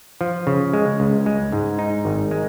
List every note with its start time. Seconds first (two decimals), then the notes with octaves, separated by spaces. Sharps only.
0.21 F3
0.47 C#3
0.73 G#3
1.00 C#2
1.26 G#3
1.52 G#2
1.79 D#4
2.05 G#1
2.31 G#3